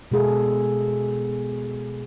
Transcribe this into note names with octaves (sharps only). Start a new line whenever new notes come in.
B2 G#3 G#4 A4